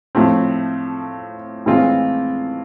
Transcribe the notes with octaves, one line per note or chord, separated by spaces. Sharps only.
A2 F3 A3 C4
A2 E3 G#3 C4 F4